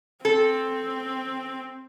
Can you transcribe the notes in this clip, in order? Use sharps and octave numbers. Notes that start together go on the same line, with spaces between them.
C4 A4